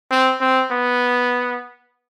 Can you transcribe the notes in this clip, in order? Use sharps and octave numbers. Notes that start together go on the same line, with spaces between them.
C4
C4
B3